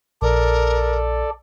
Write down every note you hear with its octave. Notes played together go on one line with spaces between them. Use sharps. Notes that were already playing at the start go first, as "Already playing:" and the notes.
A#1 A4 A#4 D5